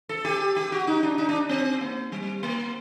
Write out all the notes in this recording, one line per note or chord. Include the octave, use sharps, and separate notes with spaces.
A4
G4
G4
F#4
D#4
D4
D#4
D4
C4
A#3
G3
A#3